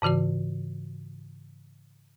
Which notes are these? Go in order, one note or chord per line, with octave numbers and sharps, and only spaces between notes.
G#2 C#3 E3 F#4 D5